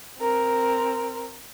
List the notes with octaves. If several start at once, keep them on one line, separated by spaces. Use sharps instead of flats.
C4 A#4